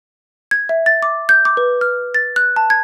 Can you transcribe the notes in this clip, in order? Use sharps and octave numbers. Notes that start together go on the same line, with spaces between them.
G#6
E5
A6
D6
G6
D6
B4
F6
A6
F#6
A5
G#6